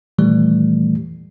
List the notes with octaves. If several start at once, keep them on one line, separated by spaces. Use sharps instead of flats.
A#2 D#3 E3 G3 A3